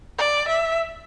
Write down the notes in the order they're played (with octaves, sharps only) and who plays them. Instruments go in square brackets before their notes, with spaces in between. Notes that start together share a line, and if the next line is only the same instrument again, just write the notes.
[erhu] D5
E5